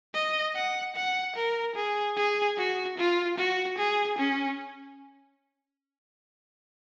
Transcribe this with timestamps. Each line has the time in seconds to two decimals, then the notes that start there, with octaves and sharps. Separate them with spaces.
0.14 D#5
0.55 F#5
0.96 F#5
1.36 A#4
1.76 G#4
2.17 G#4
2.57 F#4
2.98 F4
3.38 F#4
3.78 G#4
4.18 C#4